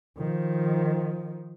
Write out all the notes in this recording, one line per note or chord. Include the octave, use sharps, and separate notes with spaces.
D#3 F3